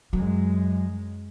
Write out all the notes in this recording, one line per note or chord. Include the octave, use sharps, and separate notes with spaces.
F#2 F#3 G#3